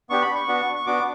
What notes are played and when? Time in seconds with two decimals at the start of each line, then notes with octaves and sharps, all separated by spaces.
0.10 B3 D4 G4 C#6
0.22 B5
0.35 C#6
0.48 B3 D4 F#4
0.76 C#6
0.86 B3 D4 F#4 D6